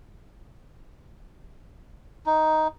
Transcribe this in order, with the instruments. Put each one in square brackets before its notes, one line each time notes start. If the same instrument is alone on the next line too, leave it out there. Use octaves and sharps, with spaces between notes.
[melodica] D#4